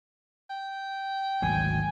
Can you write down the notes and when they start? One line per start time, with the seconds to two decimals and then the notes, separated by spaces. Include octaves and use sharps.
0.50 G5
1.42 G#1 D2 F#3 G#5